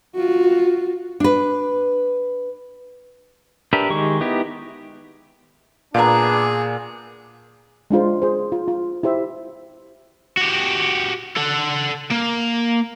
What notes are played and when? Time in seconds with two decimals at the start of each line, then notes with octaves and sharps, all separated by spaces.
0.15 F4 F#4
1.20 D4 B4
3.73 D4 G4 A#4 B4 E5
3.90 D#3 G#3 G4 C#6
4.21 B3 D#4 E4 G4
5.95 A#2 B3 D4 G#4 F5 A#5
7.90 G#3 D4 F4 C5
8.22 G#4 C5
8.52 F4
8.68 F4
9.03 E4 G4 C5 E5
10.37 F#4 G4
11.37 A4 F#5
12.11 A#3